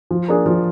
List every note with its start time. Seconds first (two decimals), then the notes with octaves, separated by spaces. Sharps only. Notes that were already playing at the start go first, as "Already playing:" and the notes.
0.11 F3
0.28 A#3 D4 G#4
0.46 F3